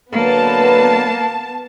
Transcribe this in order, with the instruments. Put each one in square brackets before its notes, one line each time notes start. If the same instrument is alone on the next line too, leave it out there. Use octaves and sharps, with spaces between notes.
[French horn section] D3 F#3 B4 [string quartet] A#3 [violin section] B3 A5